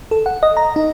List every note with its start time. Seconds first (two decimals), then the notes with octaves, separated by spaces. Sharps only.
0.11 A4
0.26 F#5
0.43 D#5
0.57 A#5
0.76 D#4